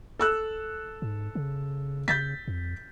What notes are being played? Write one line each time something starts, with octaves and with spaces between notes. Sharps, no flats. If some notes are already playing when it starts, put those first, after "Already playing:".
A4 E6 F#6
G#2
C#3
C#3 G6 A6 B6
F2